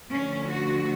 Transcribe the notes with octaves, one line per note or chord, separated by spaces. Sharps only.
D2 D3 F3 C#4
F#4